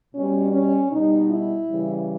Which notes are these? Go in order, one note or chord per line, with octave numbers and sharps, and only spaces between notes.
B2 G3 C#4
C#4
B2 G3 D#4
E4
C#3 E3 G3